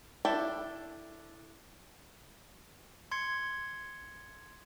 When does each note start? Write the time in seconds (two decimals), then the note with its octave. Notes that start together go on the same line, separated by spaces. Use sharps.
0.25 D4 E4 A4 G5
3.11 C6 G#6 C#7